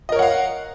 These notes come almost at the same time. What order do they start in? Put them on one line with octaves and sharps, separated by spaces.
D#5 A#4 C#5 F#5 F5